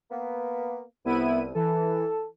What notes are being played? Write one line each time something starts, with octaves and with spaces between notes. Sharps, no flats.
A#3 B3
C2 B3 E4 D#7
E3 A4